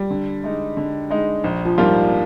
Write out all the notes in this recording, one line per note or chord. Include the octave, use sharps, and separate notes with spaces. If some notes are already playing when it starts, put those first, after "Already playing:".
Already playing: G3
D3
G#3 D#4
D3
G#3 D#4
A#1
F3
G#2 F3 G3 A#3 F4